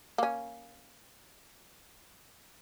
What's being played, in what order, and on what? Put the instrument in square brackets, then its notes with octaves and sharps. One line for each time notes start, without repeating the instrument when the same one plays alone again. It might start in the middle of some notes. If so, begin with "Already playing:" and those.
[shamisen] A#3 C#4